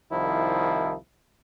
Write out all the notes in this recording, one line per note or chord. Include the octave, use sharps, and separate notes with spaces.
C2 D#3 F3 E4